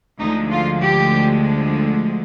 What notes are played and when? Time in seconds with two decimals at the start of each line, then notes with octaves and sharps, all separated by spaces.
0.20 D2 D3 F3 G#3 D#4
0.51 F4
0.81 G4